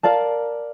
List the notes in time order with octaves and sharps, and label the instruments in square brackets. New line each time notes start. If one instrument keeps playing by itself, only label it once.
[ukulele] A#4 D5 F5 A5